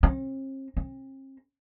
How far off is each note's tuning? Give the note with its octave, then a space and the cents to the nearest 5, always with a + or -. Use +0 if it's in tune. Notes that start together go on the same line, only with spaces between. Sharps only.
C4 +45
C4 +40